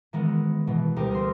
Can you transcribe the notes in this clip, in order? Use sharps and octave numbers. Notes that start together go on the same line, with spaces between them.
D#3 E3 G#3 B3
B2 E3
D2 G3 D4 G4 A#4 D#6
C6 E6 F6 A#6